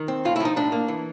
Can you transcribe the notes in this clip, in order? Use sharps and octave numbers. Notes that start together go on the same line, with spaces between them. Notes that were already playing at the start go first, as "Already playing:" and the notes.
Already playing: D#3
C4
A2 F4
E4
F3 D#4
A2 D4
A#3
E3